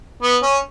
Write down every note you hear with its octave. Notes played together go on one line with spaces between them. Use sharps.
B3
C#4